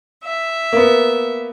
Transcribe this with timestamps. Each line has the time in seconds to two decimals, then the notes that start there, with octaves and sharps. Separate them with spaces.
0.24 E5
0.73 A#3 B3